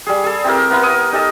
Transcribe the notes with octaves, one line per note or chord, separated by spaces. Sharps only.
G3 G#4
G#4 A4
C4 E4 G4 A#4
B3 E4 A#4
C#5 D#6
D#4 G4 A4 D#5